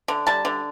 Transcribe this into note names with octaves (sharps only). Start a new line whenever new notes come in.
D3
G3 A5
D3